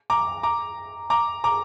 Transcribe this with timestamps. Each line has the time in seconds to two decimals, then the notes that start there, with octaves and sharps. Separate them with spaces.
0.10 A#5 D6
0.43 A#5 D6
1.10 A#5 D6
1.44 A#5 D6